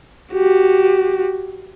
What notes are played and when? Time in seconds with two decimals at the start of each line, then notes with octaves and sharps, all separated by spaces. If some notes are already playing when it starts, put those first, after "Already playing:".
0.33 F#4 G4